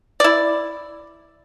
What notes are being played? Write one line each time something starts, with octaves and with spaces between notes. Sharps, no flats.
E4 D5